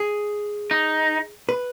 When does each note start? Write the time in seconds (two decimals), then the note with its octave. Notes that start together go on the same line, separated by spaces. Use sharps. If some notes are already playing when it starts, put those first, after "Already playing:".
Already playing: G#4
0.71 D#4
1.49 B4